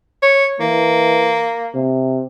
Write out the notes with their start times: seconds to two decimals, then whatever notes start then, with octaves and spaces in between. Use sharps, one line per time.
0.22 C#5
0.60 E3 A#3
1.75 C3